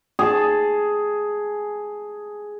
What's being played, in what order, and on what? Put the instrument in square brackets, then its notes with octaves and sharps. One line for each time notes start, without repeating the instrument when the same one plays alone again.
[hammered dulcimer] G#4 A5